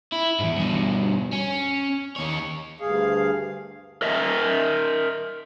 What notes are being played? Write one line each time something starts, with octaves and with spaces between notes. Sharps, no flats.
E4
E2 G#2
G2 B2
C#4
D#2 C#5
D2 G2 G#4 F5
A#4 D#5 E5